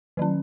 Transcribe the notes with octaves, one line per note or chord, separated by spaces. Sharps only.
D#3 F#3 C#4